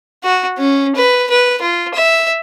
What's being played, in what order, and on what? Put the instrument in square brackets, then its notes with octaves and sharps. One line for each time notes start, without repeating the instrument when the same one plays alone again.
[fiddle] F#4
C#4
B4
B4
F4
E5